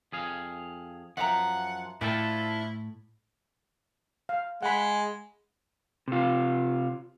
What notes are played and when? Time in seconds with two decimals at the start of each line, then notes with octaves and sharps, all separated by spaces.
0.12 F2 G#4 F5
1.17 F#2 F3 E5 F#5 G5 A#5
2.01 A2 D4 E4 F4 A4 C5 G5 A5
4.29 F5
4.63 G#3 F#5 B5
6.08 C3 F4